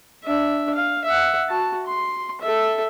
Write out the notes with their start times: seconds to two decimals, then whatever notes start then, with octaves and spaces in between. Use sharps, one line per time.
0.24 D4 E5
0.75 F5
1.05 E5 F#5
1.49 F#4 A5
1.87 C6
2.41 A4 E5